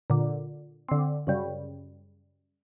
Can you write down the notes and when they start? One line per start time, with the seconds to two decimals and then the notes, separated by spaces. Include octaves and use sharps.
0.10 A#2 D3
0.89 D3 C4
1.27 F#2 C#3 G3